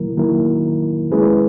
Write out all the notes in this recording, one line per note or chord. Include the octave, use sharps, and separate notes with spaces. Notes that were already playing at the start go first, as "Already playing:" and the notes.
Already playing: D#3 F#3 A#3 E4 A#4
D#3 F#3 A#3 E4 A#4
G#3 C#4 E4 G#4 B4